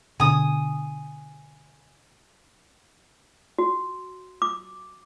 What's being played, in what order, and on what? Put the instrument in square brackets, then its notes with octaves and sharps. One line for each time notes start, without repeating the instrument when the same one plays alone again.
[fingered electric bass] B2 D3 [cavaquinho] G#5 D#6
[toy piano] F#4
D6